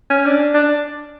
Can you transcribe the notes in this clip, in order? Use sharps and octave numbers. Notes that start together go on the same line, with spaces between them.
C#4
D4
D4